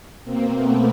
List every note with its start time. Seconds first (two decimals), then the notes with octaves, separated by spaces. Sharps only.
0.24 B2 A#3 C4
0.54 A3 B3